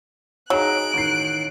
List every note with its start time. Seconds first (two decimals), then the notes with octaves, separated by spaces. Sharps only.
0.50 F#3 D#4 G#4 A#5 F#6 D7
0.94 A1 D#3 C7